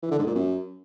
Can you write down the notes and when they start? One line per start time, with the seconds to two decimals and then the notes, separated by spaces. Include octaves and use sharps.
0.03 E3
0.11 D3
0.19 G#2
0.27 A#2
0.35 F#2